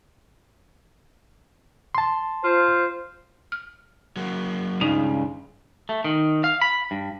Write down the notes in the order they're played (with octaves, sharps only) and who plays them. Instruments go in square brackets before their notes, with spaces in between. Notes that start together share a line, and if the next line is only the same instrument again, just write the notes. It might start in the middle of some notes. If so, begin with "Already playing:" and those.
[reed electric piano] A5 C6
[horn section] F4 C5
[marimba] F6
[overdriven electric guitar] F#3 A#3
[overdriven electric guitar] C#2 [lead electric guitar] G2 C#3 [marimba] D#4
[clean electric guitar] A3
D#3
F5
B5
G2